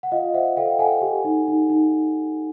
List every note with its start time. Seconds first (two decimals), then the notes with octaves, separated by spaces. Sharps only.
0.03 F#5
0.11 F4 D#5 F5
0.34 C5 E5 F#5
0.57 A4 F5 G5
0.79 A4 F#5 G#5
1.01 G4
1.25 D#4
1.48 D#4
1.70 D#4